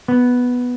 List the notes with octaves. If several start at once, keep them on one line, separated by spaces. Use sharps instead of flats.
B3